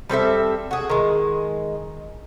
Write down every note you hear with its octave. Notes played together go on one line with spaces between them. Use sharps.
G3 C4 A4 E5
F#4 G#4
D#3 G#3